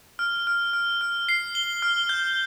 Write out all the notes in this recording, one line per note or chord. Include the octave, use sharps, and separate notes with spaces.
F6
F6
F6
F6
C7
G7
F6
G6